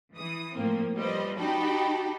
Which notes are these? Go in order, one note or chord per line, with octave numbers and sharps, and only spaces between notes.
E3 D#6
A2 F3 A#3 C4
F3 G3 B4 C5 D#5
D#4 F#4 G4 G5 A5 B5